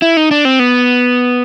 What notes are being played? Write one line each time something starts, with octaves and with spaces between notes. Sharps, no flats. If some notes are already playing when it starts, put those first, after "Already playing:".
E4
D#4
D4
C4
B3